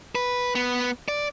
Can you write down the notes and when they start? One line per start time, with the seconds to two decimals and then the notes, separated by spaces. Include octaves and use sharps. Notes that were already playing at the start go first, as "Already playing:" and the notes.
0.15 B4
0.55 B3
1.08 D5